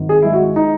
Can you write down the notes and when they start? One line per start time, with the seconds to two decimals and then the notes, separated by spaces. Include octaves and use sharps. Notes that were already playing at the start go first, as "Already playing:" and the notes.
Already playing: G#1
0.09 G#4
0.22 G#3 E4
0.33 F#4
0.56 D#4